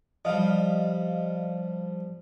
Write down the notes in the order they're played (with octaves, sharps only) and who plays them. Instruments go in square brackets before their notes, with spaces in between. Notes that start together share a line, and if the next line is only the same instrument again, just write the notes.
[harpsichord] F3 G3 [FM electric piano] D#5 F5